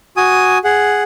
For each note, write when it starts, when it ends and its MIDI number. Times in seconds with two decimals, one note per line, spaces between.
0.17 0.58 66
0.17 0.58 80
0.17 0.58 87
0.64 1.03 68
0.64 1.03 78